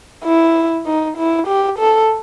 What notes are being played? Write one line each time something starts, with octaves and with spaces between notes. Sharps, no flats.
E4
D#4
E4
G4
A4